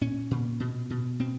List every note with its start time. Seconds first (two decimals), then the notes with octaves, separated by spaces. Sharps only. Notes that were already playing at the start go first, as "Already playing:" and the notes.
0.01 A#2 C#4
0.31 A#2
0.60 B2
0.90 B2
1.19 B2 C4